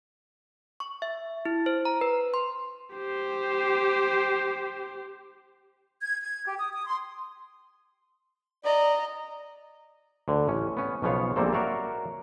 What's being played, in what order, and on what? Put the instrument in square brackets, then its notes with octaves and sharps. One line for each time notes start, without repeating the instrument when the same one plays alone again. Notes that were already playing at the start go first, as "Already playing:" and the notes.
[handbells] C#6
E5
E4
C5
A#5
B4
C6
[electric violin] G4 C5
[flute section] G#6
G#6
G4
D#6
D#6
C6
[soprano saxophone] D5 [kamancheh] D#5 A#5
[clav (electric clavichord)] D2 D3
A1 C#4
B3 C#4
B1 C#3 F3 B3 C#5 F5
A#1 A#2 G3 A#3 C4 A4
F#4 A#4 C#5 D5 E5 F5